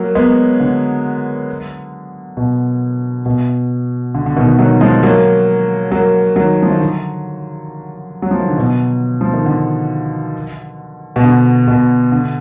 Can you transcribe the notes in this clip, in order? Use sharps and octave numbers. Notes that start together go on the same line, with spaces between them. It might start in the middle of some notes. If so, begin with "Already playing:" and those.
Already playing: F#3 A#3
G#3 B3
D3
B2
B2
D3
D3
B2 D#3
D#3 F#3
F3 G#3
F#3 A#3
F#3 A#3
D#3 F#3
F3
D#3
D3
F#3
F3
D#3
D3
B2
F3
D#3
D3
B2
D3
B2
D3